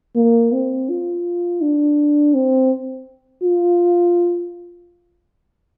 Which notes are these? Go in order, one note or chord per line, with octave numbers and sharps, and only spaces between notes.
A#3
C4
F4
D4
C4
F4